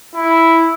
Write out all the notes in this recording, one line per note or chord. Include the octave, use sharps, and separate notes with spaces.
E4